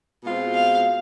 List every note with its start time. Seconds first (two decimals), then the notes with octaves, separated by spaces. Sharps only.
0.22 B2 G#3 C4 F4
0.54 F5